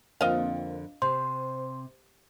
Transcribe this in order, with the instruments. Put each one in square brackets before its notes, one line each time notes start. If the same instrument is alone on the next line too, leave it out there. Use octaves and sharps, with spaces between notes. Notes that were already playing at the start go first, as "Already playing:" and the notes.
[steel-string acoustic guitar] F2 D3 [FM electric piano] A#3 C4 F4 [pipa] D#5 F5
[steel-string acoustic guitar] C3 [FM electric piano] C5 [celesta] C6